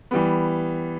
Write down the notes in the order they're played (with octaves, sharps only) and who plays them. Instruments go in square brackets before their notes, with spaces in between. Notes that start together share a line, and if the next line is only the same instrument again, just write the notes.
[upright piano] E3 G3 B3